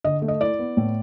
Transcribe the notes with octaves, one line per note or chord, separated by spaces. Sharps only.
D3 D#5
A3
D#5
E4 D5
B3
A2